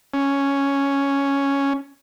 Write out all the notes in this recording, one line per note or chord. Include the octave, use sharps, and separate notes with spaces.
C#4